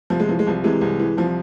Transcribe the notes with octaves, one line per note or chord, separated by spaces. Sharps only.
C2 F3
G#3
E3 F3
G#3
C2 F3
C3 E3 G#3
C2
E3
C2 F3